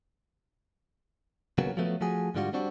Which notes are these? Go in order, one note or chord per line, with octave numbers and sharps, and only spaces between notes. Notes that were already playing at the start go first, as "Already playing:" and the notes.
C#3 F#3 A#3 B3
F3 F#3 A3 B3
F3 A3 F#4 G#4
G#2 D3 G3 F4 F#4
G3 C4 D4 F#4